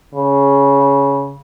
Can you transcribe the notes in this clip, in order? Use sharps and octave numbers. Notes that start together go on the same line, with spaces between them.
C#3